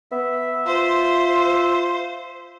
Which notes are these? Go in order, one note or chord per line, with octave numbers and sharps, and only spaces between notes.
B3 E5
F4 C5